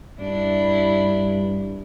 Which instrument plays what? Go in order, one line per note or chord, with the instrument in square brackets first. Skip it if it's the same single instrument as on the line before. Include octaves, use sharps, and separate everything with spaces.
[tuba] G2 [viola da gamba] D4 E4